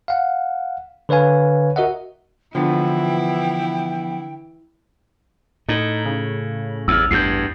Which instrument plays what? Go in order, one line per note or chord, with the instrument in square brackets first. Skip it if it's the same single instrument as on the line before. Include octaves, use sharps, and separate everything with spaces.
[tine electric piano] F5 F#5
D3 B4 C#5 F5 G#5
F#4 A#4 D#5 E5 F#5
[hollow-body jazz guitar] D3 [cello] E3 E4 [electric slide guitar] F3 B3 [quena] G5
[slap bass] A2 [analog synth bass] D#4
[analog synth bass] C#3
[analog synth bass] A1 [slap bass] E2 [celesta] E6 F6
[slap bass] E2 G2 [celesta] G6 C7